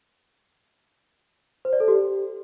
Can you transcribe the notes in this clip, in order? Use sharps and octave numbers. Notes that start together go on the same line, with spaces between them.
C5
D5
A4
G4